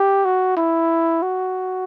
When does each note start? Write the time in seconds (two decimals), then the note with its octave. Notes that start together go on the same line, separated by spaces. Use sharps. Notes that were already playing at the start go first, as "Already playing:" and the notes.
Already playing: G4
0.25 F#4
0.57 E4
1.22 F#4